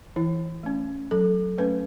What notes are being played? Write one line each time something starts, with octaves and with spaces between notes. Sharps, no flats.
E3 E4
A3 C#4
F#3 A4
A3 C#4 B4